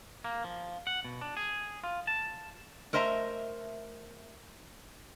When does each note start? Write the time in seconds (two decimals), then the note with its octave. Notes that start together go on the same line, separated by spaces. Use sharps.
0.24 A#3
0.44 F3
0.87 F#5
1.04 B2
1.21 D4
1.37 G#4
1.84 F4
2.07 A5
2.93 A3 A#4 C5 D#5 E5 A#5